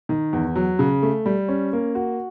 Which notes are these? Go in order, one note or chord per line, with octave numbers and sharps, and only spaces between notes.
D#3
E2
F#3
C#3
A3
G3
C#4
A#3
F#4